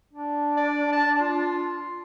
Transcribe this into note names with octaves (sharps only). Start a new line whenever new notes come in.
D4
D5
A5
F4